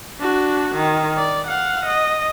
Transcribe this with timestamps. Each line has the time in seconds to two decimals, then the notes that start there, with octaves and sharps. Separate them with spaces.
0.20 D4 F#4
0.75 D#3
1.18 D5
1.47 F5 F#5
1.85 D#5